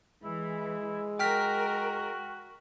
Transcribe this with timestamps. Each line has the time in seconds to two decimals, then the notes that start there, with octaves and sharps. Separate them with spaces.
0.24 E3 G#3 E4
1.19 F#4 A#4 G5 F6 B6